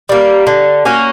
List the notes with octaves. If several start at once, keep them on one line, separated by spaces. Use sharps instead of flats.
G3 A#3
D3
A#3 C#4 F#4